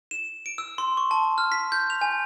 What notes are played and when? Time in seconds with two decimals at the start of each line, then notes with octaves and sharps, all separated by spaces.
0.11 E7
0.46 D7
0.58 E6
0.78 C6
0.97 C#6
1.11 A5
1.38 F6
1.52 B6
1.72 G6
1.90 F7
2.01 G#5